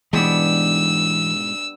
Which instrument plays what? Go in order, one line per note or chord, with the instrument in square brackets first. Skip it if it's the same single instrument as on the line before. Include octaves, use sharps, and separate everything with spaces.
[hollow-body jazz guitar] G#2 B2 G#3 [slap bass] E3 [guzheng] G3 B3 D4 [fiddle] E6